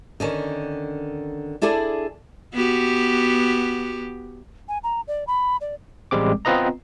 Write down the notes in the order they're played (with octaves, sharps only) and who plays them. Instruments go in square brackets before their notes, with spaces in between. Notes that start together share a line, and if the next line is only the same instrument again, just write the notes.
[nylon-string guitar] D3 D#3 C#4
D4 E4 G#4 A4 D5
[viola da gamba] B3 F#4 G4
[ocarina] G#5
A#5
D5
B5
D5
[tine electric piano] A1 G3 G#3 C4 D6
B3 C4 F4 B4 D#5 A#5